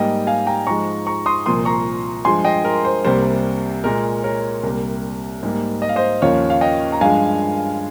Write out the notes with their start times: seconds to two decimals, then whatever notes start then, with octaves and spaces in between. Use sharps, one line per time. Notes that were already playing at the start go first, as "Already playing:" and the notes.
Already playing: G#2 G3 A#3 D#5 G5
0.27 F5 G#5
0.47 G5 A#5
0.67 G#2 F3 G#3 A#5 C#6
1.06 A#5 C#6
1.26 C6 D#6
1.46 C2 A#2 F3 A#3 C6 D#6
1.65 A#5 C#6
2.25 G2 F3 G#3 G#5 C6
2.44 D#5 G5
2.64 A#4
2.85 C5
3.04 C2 C3 G3 A#3 C5
3.84 A#2 G#3 A#4
4.23 A#4 C#5
4.63 C2 C3 G3 A#3
5.43 G#2 G3 A#3
5.82 D#5
5.89 F5
5.96 C5 D#5
6.22 D#2 C#3 F3 A#3 C#5 F5
6.50 F5
6.61 D#5 G5
6.92 A#5
7.01 G2 F3 G#3 F5 G#5